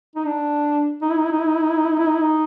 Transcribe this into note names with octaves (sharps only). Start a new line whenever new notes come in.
D#4
D4
D#4
E4
D#4
E4
D#4
E4
D#4
E4
D#4
E4
D#4
E4
D#4
E4
D#4
E4
D#4